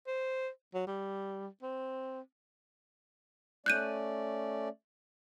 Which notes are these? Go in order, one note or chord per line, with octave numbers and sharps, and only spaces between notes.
C5
F#3
G3
C4
A3 C#4 D5 F#6 G6 D#7